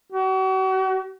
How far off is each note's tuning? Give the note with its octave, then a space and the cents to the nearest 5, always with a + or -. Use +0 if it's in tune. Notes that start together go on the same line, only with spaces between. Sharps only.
F#4 +40